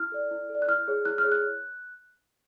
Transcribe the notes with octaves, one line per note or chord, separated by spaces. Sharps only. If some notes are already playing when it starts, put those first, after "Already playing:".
Already playing: E4 F6
A4 D5
E4
A4
D5
F#6
E4 F6
G#4 C#5
E4 F#6
F6
G#4 C#5
F#6